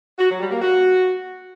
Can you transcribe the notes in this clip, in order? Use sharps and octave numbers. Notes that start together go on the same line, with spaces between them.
F#4
F#3
G3
A#3
F#4